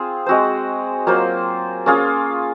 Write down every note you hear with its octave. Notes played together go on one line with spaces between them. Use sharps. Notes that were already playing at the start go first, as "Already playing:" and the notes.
Already playing: C4 F4 G#4
G#3 C4 F#4 C5
F#3 A#3 F4 C5
A#3 C#4 F4 G#4